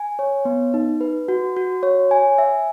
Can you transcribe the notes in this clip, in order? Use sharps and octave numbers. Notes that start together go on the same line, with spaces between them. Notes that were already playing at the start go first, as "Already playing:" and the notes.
Already playing: G#5
C#5
B3
D#4
B4
F#4
F#4
C#5
G#5
E5